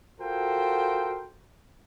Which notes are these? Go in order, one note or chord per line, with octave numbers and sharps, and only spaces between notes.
F4 F#4 A4 A#4 C5 G5